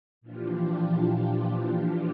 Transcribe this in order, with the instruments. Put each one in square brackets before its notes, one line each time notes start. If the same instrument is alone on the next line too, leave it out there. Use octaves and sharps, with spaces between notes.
[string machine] A#2 E3 F3 D4 F4 G4